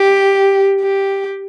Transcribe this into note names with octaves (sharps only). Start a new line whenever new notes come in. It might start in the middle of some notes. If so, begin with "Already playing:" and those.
Already playing: G4
G4